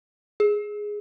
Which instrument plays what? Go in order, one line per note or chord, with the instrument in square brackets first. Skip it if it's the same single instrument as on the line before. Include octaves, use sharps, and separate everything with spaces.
[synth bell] G#4